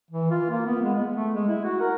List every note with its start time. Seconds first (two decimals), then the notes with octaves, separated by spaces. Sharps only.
0.11 E3
0.31 F4
0.50 A#3
0.66 B3
0.82 G#3
0.95 B3
1.16 A3
1.34 G#3
1.48 E4
1.65 F#4
1.80 A#4